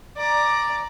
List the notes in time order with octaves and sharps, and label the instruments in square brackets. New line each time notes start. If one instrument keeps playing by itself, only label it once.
[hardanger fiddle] D5 A#5